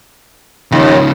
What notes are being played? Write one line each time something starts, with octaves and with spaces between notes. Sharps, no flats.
D#2 C#3 F3